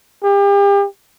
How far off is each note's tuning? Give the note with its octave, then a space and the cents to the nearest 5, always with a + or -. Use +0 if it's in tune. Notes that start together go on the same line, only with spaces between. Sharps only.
G4 +35